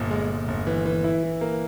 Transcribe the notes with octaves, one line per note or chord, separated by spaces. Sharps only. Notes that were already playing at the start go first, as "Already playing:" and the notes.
Already playing: G1 A#2
G#3
G#3
G1
E3
E3
E4
E3
A#3